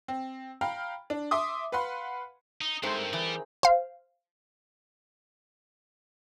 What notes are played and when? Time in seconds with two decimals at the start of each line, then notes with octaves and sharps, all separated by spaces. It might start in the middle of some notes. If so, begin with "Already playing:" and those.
0.08 C4
0.61 F5 G5 A#5 B5 F6
1.10 D4
1.31 E5 C6 D6 D#6
1.72 B4 F5 F#5 B5 C6
2.61 D#4
2.83 G2 D#3 G#3 A3 C4 D#4 C5
3.13 E3 G4 G#4 D5
3.63 C5 F5